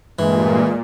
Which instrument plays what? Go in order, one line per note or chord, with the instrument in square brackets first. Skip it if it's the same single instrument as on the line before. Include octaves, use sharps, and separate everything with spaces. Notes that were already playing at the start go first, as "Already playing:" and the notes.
[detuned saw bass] G2 [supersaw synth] A#2 [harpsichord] E3 [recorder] G#3